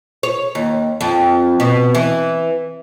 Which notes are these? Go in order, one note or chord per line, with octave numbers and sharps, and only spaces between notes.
C#5
D#2
F2
B2
E3